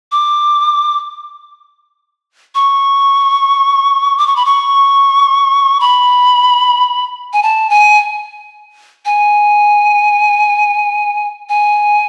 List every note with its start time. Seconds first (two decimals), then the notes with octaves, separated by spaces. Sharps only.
0.12 D6
2.55 C#6
4.18 D6
4.27 C#6
4.36 B5
4.45 C#6
5.80 B5
7.33 G#5
7.43 A5
7.70 G#5
9.05 G#5
11.49 G#5